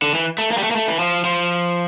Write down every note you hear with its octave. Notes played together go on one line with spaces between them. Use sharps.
D3
E3
A3
A#3
G3
A3
A#3
A3
E3
F3
F3